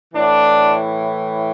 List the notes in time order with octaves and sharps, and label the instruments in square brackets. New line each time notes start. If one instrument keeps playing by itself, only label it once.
[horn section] A2 E3 D4